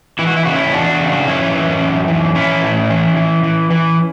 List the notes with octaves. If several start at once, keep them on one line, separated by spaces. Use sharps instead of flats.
E3 E4
F#4
E4
C#3 F#4
C#4 E4
E2 D4 F#4
C#3
F#2 C#4 E4
E3
F#2
E3
E3 C#4 E4
A2
E3
E3
E3
E3